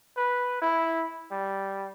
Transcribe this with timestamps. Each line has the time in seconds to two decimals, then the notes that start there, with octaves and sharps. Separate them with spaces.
0.17 B4
0.62 E4
1.32 G3